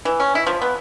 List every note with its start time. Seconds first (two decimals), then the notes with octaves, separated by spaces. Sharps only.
0.05 E3
0.20 C#4
0.35 E4
0.47 F3
0.62 B3